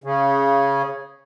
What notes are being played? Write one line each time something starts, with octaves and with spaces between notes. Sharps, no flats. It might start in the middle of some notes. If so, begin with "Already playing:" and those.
C#3